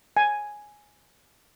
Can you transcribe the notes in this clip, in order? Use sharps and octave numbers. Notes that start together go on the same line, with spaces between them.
G#5